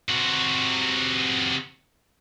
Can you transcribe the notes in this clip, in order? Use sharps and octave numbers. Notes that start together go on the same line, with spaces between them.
C3 F#4